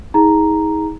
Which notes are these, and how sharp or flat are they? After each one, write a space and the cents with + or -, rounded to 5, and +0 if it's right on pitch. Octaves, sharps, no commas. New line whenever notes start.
D#4 +40 G#4 -5 A#5 +0